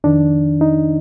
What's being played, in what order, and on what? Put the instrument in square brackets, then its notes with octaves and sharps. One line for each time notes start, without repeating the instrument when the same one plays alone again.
[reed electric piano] F2 D#3 D4
D#4